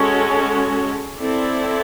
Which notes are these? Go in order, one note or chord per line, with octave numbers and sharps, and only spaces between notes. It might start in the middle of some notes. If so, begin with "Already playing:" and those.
Already playing: G#3 C#4 F#4 A4
C4 E4 A4 D5